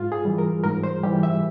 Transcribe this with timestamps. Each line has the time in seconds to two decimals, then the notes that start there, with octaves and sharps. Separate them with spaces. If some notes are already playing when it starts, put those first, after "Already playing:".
Already playing: G#2 F4
0.12 G#4
0.25 E3 G3
0.38 A#4
0.64 G#2 A#4
0.83 C5
1.03 E3 G3 G4
1.23 E5